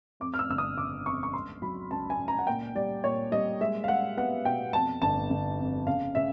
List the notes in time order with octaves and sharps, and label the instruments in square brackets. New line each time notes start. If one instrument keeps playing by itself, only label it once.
[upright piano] F2 D6
F6
E6
G1 E6
D#6
C#3 D6
F2 C#6
C#6
C#2 C6
F#3 B5
C#2 A5
G#5
C#2
A#5
F#5
A#2 G5
G3 D5
A#2 C#5
G3 D#5
G#3 E5
F5
G#3 F#5
B3 F#5
B2 G5
F2 A5
G1 A5
G1
F2
C#3 F5
C#3 E5